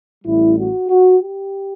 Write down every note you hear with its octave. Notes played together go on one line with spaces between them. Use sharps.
A1 A2 G3 E4
F#4
F#4
G4